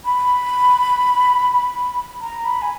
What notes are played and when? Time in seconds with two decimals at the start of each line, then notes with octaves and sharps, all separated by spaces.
0.05 B5
2.21 A#5
2.45 B5
2.62 G#5